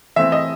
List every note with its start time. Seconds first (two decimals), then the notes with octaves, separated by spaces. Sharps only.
0.16 E3 A3 C4 E5
0.32 D#5